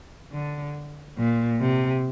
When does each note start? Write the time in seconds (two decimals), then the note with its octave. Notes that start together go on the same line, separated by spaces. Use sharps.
0.33 D3
1.18 A#2
1.60 C3